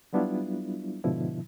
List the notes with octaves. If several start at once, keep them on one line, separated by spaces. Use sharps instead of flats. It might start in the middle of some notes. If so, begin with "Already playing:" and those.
F#3 G3 B3 D4 E4 F4
G#2 B2 D3 F3 E4